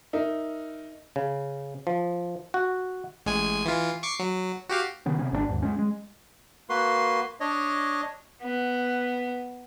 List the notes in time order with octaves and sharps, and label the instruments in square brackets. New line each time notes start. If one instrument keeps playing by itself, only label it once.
[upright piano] D#4 A#4 E5
[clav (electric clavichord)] C#3
F3
F#4
[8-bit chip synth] A1 G#3 G#5
E3 F4
C#6 D6 C7
F#3
F#4 G4 F5
[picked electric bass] C3 D#3 B3 C#4
C3 B3 C#4
G#1 C3 D4
D#2 G#2
G#3 C#4
G#3
[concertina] A#3 F#4 B4 C6
D4 C#5 D#5
[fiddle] B3